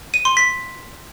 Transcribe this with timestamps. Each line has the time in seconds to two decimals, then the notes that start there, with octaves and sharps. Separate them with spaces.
0.14 D#7
0.25 C6
0.37 B6